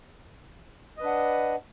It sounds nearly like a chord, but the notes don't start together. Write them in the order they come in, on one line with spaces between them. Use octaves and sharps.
D#5 B4 D4 F#5